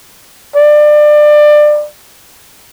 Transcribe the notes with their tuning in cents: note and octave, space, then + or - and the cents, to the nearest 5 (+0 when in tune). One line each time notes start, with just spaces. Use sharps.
D5 +25